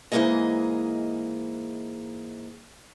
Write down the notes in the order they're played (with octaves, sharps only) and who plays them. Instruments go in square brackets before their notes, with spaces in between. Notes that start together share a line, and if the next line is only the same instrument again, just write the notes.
[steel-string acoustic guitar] G#2 E3 F#3 A#3 G#4 D#5